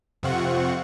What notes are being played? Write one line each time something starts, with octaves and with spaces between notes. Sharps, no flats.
F2 C3 C4 F4 F#5 C#6